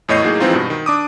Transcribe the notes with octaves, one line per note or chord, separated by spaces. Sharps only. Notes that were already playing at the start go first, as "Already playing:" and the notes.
E2 A2 C#5 D#5 G6 C7
A2 F#3 A#3 D#4 G#4
E3 F3 G#3 C4 D#4 F4
G2 B2
D#3
D4 D6 D#6